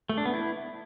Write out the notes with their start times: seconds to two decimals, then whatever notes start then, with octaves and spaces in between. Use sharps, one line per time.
0.09 A3
0.17 D4
0.25 B3
0.33 E4